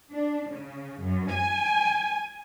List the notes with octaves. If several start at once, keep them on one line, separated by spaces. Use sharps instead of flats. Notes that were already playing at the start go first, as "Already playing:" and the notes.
D4
C#3
F#2
G#5